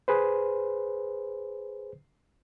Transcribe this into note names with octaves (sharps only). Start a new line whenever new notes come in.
G#4 B4 C5